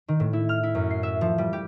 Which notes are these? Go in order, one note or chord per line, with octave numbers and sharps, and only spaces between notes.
D#3
A2
E4
F6
E4
F#2
C7
E5
F3
G3
G4